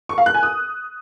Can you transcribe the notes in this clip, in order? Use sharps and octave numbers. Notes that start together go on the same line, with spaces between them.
C#6
F5
F#6
G#5
D#6